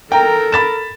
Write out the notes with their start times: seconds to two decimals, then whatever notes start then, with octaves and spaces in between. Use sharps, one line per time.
0.12 A4 A#4 G5 A#5
0.52 B5 A6 E7